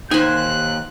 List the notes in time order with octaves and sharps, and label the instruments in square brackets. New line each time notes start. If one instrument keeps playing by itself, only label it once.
[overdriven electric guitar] D#2 [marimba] D#4 [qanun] C5 G#5 [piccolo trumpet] F#6